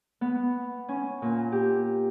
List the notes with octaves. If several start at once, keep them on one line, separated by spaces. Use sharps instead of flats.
B3
C#4
A#2
G4